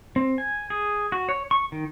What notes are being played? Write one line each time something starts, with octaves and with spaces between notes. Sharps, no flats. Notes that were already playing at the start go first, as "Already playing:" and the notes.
C4
G#5
G#4
F#4
C#5
C#6
D#3